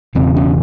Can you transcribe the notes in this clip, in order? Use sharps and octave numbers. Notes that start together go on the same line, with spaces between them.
E1 E2 C#3 C4
C#4